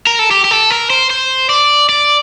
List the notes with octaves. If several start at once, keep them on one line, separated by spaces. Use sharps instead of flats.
A#4
A4
G4
G4
A4
A#4
C5
C5
D5
D5